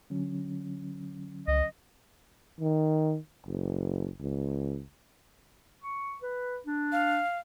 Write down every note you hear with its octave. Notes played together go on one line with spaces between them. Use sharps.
D3 F#3 C#4
C#2 D#5
D#3
F#1
C#2
C#6
B4
D4
F5